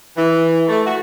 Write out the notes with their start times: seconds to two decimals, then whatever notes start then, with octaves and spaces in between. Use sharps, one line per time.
0.16 E3
0.68 A3
0.84 F#4